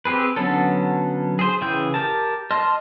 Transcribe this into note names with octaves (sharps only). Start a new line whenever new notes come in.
C4 G4 G#4 B4
D3 F#3 B3 C#4 A4
G#4 C5
C#3 E3 G#4 G5 G6
G4 A#4 A5
D#5 A5 C6 F6